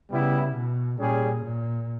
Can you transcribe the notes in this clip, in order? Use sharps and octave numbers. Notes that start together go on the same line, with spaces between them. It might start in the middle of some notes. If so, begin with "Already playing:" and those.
C#3 G3 B3 E4
B2
A#2 G3 C#4 G#4
A#2